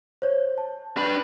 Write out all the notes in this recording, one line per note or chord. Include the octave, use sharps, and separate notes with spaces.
C5 C#5
A5
D4 B4